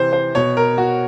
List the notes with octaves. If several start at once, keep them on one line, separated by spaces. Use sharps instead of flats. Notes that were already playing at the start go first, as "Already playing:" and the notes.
Already playing: C3 E3 C5
C5
B2 C#5
A#4
F#4